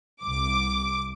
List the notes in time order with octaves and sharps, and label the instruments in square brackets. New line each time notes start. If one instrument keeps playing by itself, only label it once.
[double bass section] C2 [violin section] D6